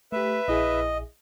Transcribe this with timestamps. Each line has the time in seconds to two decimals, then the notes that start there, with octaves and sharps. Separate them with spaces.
0.12 A3 G4 B4 E5
0.48 A#1 E4 G#4 D#5